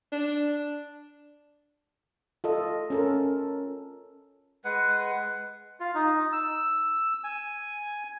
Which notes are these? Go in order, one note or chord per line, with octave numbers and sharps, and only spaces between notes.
D4
F4 A4 D#5
C#4 A4 A#4
G#3 B4 F#5
F4
D#4
E6
G#5